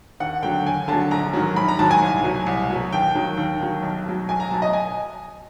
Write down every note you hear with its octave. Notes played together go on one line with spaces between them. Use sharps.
D#2 F#5
D3 F#3 G5
D#2 G#5
D3 F#3 A5
A#1 A#5
G#2 D#3 F#3
A#1 B5
A#5
G#2 D#3 F#3 A5
G#5
C2
B2 F#3
C2
B2 F#3
D#2 G5
D#3 F#3
D#2
D#3 F#3
B1
B2 F#3
B1 G#5
A#5
B2 F#3 A5
D#5
G#5